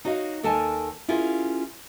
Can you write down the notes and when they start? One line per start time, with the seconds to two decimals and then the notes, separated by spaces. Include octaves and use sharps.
0.05 D#4 F#4 C#5 D#5 F5
0.43 D#2 D#3 A4 A#4 G#5 A5
1.08 C#4 E4 F4 G4 G#4 A#4